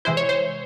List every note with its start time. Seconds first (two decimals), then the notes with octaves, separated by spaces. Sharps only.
0.05 C3 E3 G#3 E4 C5
0.17 C#5
0.29 C5